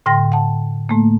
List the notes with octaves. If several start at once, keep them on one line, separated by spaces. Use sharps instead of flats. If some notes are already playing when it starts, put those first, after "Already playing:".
A2 D3 G5 C6 A#6
F#5 A5
A2 A3 A#3